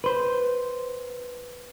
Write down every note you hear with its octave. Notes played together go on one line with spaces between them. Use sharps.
B4 C5